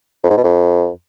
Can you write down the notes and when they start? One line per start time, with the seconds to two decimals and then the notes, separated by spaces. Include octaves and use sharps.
0.24 F2
0.31 G#2
0.37 B2
0.44 F2